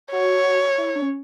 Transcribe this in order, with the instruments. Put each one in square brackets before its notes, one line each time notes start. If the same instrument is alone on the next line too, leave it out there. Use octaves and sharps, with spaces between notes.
[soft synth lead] F#4 [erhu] C#5
[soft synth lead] E4
D4
C#4